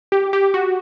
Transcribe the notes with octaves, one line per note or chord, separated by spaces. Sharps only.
G4
G4
F#4